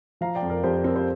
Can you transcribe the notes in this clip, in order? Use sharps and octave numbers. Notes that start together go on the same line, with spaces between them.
F3 F5 A#5
D5 G5
F2
A#4 D5
F2 G4 C5
A#4
C4 A#4
G4 C5